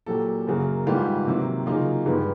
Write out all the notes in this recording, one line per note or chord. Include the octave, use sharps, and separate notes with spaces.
A#2 F#3 A#3 G4 A4
F#2 C#3 F#3 A#3
G#2 D#3 G3 B3 F4 G4
C3 D#3 F#3 A#3
C#3 F#3 A#3 D#4 F4
G2 D#3 G#3 B3